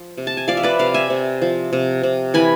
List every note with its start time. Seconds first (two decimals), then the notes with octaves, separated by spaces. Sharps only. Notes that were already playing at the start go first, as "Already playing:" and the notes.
Already playing: F3
0.17 C3
0.27 A5
0.37 G#5
0.48 F3 D5 F5
0.57 E5
0.63 B4 D5
0.79 C3 D5 F5
0.94 E5 G#5
1.10 C3
1.42 F3
1.73 C3
2.03 C3
2.34 E3 G#5 B5